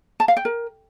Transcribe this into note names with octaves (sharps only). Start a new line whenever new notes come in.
A5
F5
G5
A#4